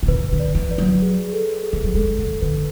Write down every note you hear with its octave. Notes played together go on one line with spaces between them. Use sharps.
B2
C#3 B4
D3
B4 D5
E3
B4 D5
F#3
G#4
A4
G#4
E3
F#3
G#3 A4
D3 A4
D3 B4